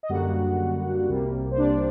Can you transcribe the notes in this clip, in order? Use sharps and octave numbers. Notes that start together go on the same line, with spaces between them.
D#5
F#2 D3 G3 A#3 F#4 F#5
C2 C3 G3 A#3
C5
D4 D5